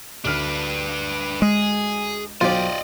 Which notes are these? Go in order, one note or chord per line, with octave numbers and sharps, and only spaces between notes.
D2 D4 B4 F6
G#3 G#4
B1 F#3 F4 G4 C5 D5 D#5